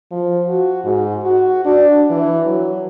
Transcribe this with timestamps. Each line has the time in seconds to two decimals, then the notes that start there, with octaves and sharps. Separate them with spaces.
0.11 F3
0.48 F#4
0.84 G#2
1.23 F#4
1.65 D4
2.10 E3
2.46 F#3